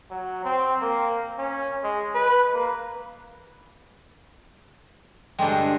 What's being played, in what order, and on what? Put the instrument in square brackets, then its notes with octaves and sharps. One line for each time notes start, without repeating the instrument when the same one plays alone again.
[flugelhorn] F#3
C4
A#3
C#4
G#3
B4
A#3
[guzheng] G2 D3 G#3 [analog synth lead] G5